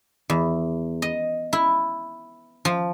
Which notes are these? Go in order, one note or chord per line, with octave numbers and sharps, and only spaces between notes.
E2
D#5
E4
F3